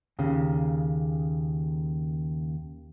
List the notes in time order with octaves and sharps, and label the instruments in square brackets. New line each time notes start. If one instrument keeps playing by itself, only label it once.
[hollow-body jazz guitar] D#2 C#3